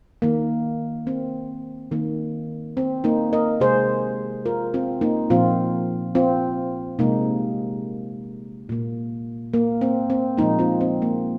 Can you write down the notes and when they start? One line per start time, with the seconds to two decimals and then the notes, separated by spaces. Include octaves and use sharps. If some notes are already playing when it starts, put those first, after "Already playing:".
0.22 D#3 A#3
1.07 C4
1.92 D#3 A#3
2.77 C4
3.04 A#3 D#4
3.33 A#4 D#5
3.60 C3 G#3 G#4 C5
4.45 F4 A#4
4.74 C4 F4
5.01 A#3 D#4
5.30 A#2 F3 A#3 C4 F4
6.15 C4 F4
6.99 C3 G#3 A#3 D#4
8.69 A#2 A#3
9.53 A#3
9.81 C4
10.10 C4
10.37 A#2 F3 G#3 A#3 D#4
10.59 C4 F4
10.81 C4
11.02 A#3